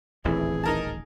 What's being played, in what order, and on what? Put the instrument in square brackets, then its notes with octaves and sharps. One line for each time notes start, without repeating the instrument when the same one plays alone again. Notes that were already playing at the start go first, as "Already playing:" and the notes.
[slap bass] D#1 A1 D2 [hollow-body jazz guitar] E3 C4 E4 [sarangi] G#4
[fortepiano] D#4 A#4 A5